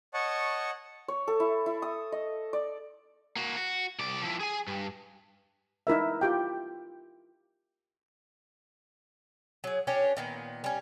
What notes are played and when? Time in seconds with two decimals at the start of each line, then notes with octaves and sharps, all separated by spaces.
0.14 C#5 D#5 F#5 A5 C#6
1.08 C#5
1.28 A4
1.40 E4
1.66 E4
1.82 D#6
2.12 D#5
2.53 D5
3.36 A#3 F#4
3.57 F#4
3.99 C2 D5
4.22 F3 E4
4.40 G#4 G#5
4.68 G2
5.87 D#4 E4 A#4 E5
6.21 F4 G4 G5
9.64 F#3 G#4
9.87 C#4 D4 G4
10.17 A#2 D#3 B3
10.64 G3 C#4